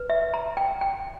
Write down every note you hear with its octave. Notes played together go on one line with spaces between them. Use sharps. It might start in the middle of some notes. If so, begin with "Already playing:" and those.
Already playing: B4
E5
A#5
G5
G5